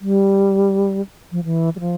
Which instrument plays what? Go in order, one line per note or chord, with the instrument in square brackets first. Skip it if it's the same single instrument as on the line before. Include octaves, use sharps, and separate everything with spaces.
[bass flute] G3
F3
E3
G3
F3